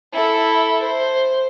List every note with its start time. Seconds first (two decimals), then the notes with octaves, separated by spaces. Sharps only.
0.13 E4 A4
0.82 C5